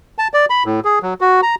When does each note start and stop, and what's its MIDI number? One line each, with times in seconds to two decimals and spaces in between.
0.18 0.28 81
0.34 0.46 74
0.50 0.63 83
0.66 0.80 45
0.85 0.99 68
1.03 1.14 54
1.21 1.41 66
1.43 1.55 82